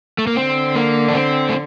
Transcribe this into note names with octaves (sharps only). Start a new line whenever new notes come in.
A3
A#3
D3 C4
A#3
D4
C4
A3